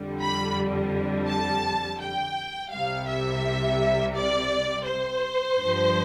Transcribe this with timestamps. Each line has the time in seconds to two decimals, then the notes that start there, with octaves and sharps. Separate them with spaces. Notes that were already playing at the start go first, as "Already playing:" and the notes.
Already playing: F2 D3 G3
0.22 B5
1.28 A5
2.00 G5
2.71 C2 C3 G3 F5
3.08 E5
4.15 D5
4.86 C5
5.57 G2 F3